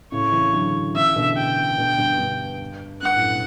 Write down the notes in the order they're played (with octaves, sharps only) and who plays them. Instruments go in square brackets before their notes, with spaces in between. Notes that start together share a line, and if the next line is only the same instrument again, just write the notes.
[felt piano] A2 C#3 [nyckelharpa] C#5
[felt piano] C#3 E3
D3 F#3
[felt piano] C#3 E3 [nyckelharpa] E5
[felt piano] B2 D3
[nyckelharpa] G5
[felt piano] B2 D3
G2 B2
G2
[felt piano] G2 [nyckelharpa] F#5
[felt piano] F#2 A2
B2